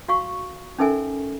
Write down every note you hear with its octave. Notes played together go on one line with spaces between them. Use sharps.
F#4 F5 C#6
C#4 D#4 A4 A#4 E5 G#5